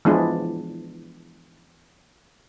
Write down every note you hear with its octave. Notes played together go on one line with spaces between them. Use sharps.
E3 F3 G#3 B3 D4 E4